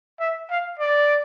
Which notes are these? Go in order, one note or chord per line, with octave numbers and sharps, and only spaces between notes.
E5
F5
D5